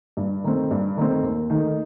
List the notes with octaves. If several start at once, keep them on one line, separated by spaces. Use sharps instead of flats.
G2
D#3 A3 C4
G2
D#3 A3 C4
D#2
D#3 A3 D#4